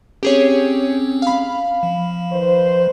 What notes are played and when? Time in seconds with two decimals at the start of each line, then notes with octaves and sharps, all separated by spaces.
0.23 C4 C#4 G4 G#4 C#5
1.22 F5 B5
1.83 F3
2.31 D#3 B4 C5